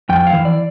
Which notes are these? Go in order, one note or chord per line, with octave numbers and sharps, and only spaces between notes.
F2 G5
F5
E3
D5